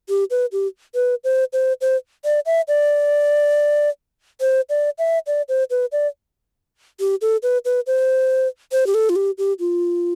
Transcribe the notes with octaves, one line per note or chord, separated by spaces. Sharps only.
G4
B4
G4
B4
C5
C5
C5
D5
E5
D5
C5
D5
E5
D5
C5
B4
D5
G4
A4
B4
B4
C5
C5
G4
A4
F4
G4
G4
F4